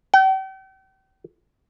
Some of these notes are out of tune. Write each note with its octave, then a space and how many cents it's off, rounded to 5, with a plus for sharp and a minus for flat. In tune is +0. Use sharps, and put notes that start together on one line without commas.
G5 -40